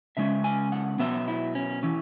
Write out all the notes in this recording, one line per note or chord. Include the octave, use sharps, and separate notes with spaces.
C#3 G#3 C#4 E5
G#5
F#5
B2 F#3 B3 E5
E4
C#4
E3 C#4 E4